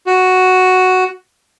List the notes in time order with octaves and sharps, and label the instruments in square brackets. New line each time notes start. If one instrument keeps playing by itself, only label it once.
[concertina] F#4